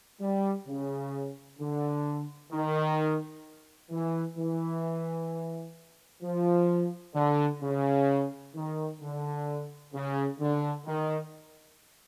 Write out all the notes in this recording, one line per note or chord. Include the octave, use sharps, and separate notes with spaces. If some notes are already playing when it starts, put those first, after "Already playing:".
G3
C#3
D3
D#3
E3
E3
F3
D3
C#3
D#3
D3
C#3
D3
D#3